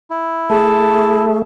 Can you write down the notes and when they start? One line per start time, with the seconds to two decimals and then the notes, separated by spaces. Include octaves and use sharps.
0.10 E4
0.50 A3 G#4 A5